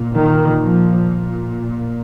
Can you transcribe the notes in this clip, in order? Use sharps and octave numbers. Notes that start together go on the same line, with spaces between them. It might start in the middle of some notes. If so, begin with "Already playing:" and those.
Already playing: A#2
D#3
F3